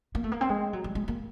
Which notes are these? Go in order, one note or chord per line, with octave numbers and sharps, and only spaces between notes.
A#3
A3
A#3
C4
G#3
F#3
G3
G#3
A#3